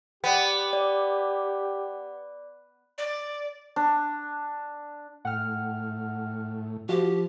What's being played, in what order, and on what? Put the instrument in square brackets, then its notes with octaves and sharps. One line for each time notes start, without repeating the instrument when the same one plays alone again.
[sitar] B3 [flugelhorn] G4 [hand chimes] D5 G5
[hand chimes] D5
[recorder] D5
[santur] D4
[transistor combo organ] A2 [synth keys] F#5 G5 F6
[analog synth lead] F3 [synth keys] F#4 [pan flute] G4